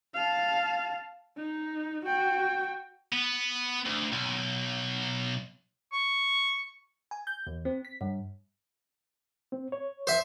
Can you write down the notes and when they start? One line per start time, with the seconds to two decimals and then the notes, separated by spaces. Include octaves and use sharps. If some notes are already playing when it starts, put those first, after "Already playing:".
0.14 F5 A5
1.37 D#4
2.05 F#4 G5
3.12 B3
3.86 D2
4.12 B1
5.93 C#6
7.11 G#5
7.27 G6
7.47 E2
7.65 C4
7.85 B6
8.01 G2
9.52 C4
9.72 C#5
10.07 C5 E5